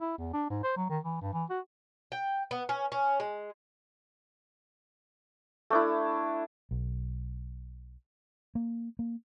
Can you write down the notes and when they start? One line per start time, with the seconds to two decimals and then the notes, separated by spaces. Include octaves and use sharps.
0.01 E4
0.18 E2
0.33 D4
0.50 G#2
0.63 C5
0.77 F#3
0.89 D#3
1.04 E3
1.22 G2
1.34 E3
1.50 F#4
2.12 G5
2.51 B3
2.69 C#4
2.92 C#4
3.20 G#3
5.70 A3 D4 E4
6.71 B1
8.55 A#3
8.99 A#3